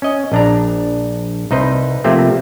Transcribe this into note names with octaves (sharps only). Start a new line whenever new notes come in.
C#4 D#5
A#1 D4 A#5
C2 D#4 B4 C5
C3 F3 A3 A#3 C4